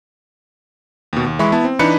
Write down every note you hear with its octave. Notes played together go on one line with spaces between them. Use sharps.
D#2 B2
D#2
E3 G#3 E5 B5 C#6
B3 E4 A5
C4
E3 D4 D#4 B4 B5 C#7